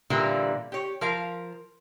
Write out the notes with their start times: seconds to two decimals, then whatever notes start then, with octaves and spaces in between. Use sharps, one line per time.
0.10 A#2 D3 E3 G3 A#3
0.72 G4 C#5
1.01 F3 A#4 F5